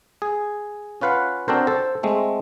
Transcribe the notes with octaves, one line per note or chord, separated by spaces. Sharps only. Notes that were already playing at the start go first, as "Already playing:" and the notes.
G#4
C#4 F4 B4 F5 F#5
C4 D4 F#4 A4 A#4 C5
A4 C5
G#3 A3 C4